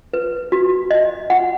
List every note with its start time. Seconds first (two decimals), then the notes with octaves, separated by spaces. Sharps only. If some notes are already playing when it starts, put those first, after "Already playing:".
0.14 B4
0.52 F#4
0.91 D#5
1.30 F#5